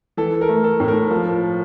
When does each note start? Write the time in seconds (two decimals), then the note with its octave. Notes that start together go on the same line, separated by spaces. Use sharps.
0.17 E3 A4
0.41 A#4
0.49 A3
0.64 A4
0.80 A2
0.88 A#4
1.11 F3